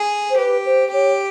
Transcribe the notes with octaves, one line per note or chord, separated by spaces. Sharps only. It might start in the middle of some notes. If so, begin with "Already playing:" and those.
Already playing: G#4
C5
G4 B4
C5
G4 C#5